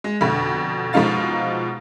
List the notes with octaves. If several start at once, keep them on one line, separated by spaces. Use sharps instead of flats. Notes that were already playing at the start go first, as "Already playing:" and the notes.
G#3
F2 B2 D3
B2 F3 G#3 D#4 F5 A6